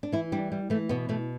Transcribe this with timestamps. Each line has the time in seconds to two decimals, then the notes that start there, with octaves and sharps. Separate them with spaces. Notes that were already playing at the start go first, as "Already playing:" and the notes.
0.03 D4
0.12 E3 E4
0.32 G3 D4
0.52 G3
0.70 E3 A3
0.89 B2 B3
1.09 B2 A3